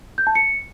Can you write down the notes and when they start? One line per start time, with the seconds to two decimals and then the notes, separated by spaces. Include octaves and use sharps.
0.18 G6
0.27 A5
0.35 C#7